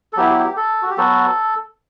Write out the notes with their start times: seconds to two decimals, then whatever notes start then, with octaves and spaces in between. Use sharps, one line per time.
0.13 A4
0.17 F#3 B3 E4 G4
0.30 G4
0.44 G4
0.57 A4
0.82 F#4
0.90 G4
0.97 F#3 B3 F#4 A4